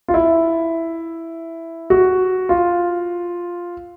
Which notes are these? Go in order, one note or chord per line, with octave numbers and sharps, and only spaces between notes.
F4
E4
F#4
F4